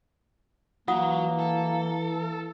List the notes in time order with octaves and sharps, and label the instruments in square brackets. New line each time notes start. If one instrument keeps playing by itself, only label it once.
[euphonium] E3 [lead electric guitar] F#3 [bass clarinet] A#3 [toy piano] F4 F#5 D#6
[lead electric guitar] A4